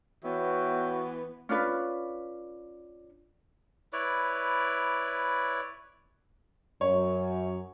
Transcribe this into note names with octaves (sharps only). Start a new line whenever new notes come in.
E3 B3 F#4 C#5 E5 G5
C#4 D4 F4 B4
E4 B4 C#5 D5
F#2 C#5